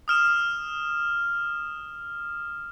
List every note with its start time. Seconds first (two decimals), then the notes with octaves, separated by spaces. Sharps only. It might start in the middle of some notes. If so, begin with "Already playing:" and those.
0.08 D#6 F6 E7